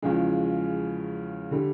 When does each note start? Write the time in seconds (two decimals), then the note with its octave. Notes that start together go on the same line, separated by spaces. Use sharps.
0.02 E2 C#3 F3 G#3
1.51 D3 G3